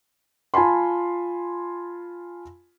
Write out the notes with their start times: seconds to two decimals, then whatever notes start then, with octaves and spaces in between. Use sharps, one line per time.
0.54 F4 G#5 A5 B5 C6